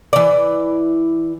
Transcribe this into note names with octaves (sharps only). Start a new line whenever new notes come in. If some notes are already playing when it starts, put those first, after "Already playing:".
E3 D5